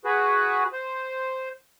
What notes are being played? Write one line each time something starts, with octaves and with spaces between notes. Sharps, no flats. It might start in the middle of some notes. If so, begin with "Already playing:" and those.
F#4 G#4 B4
C5